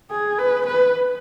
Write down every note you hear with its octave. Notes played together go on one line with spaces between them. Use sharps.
G#4
B4
B4